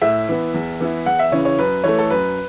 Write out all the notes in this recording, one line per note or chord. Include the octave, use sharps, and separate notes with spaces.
A2 E5
E3 B3
E2
E3 B3 E4
E2 F#5
E5
C#3 E3 C#4 E4 C#5
C#5
F#2 B4
E3 A3 C#5
A4
F#2 B4